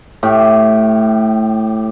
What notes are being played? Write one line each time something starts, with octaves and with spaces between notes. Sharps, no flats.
A2 G4